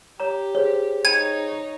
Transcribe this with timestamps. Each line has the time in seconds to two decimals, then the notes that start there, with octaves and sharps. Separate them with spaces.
0.20 G4 C#5 A#5
0.55 G#4 C5 C#5
1.05 D#4 C#5 G5 B5 G#6 D#7